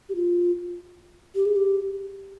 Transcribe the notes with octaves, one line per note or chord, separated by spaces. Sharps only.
G4
F4
G4
G#4
G4